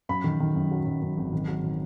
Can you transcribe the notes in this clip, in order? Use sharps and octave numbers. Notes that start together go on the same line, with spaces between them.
F#2 B5
D#3
D#3
F#2
F#3
F#2
F#2
G#1
D#3
F#3
D#3